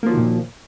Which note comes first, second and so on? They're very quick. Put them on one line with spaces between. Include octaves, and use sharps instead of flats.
A#3 F3 F#3 D#3 A#2